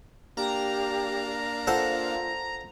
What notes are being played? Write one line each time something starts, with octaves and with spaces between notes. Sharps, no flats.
A#3 D4 G4 F5 A#5
F4 A4 C5 F#5